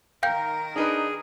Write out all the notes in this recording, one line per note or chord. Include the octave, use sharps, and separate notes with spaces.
D#3 A#4 F5 G5 G6
D4 D#4 G#4 B4